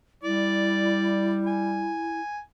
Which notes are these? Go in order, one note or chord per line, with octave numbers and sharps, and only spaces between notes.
G3 E4 D5
G#5